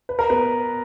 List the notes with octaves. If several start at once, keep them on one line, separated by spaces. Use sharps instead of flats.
B4
A#4
B3 B4